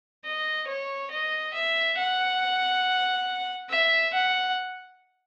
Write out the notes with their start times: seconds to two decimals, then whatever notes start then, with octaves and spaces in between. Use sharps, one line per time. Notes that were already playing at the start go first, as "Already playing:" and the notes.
0.25 D#5
0.68 C#5
1.11 D#5
1.54 E5
1.97 F#5
3.70 E5
4.13 F#5